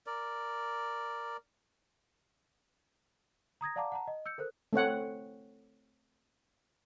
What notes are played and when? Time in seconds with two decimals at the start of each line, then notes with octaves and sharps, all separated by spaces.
0.07 A#4 D5
3.61 A#5 D#6 G#6 A#6
3.76 D5 F5 F#5 A5 A#5 D6
3.92 F#5 A5 A#5
4.07 D#5
4.26 E6 G6 C#7
4.38 A4 A#4 C5 F#6
4.73 A3 C4 C#5 F#5